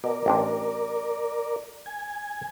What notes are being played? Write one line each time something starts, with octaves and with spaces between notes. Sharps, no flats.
B2 A#4 D5
A1 C4 D4
G#5